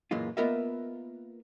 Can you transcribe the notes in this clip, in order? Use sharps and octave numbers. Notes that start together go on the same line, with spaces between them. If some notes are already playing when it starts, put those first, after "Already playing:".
F#2 A#2 E3 G#3 F4
A#3 B3 F4 A#4 D#5 E5